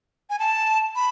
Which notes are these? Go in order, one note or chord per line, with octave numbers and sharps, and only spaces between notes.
G#5
A5
B5